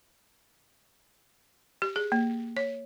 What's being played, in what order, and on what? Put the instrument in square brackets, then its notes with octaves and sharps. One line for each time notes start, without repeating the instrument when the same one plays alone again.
[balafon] G4
G#4
A#3
C#5